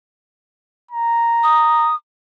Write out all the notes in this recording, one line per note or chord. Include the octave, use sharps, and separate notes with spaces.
A#5
D#6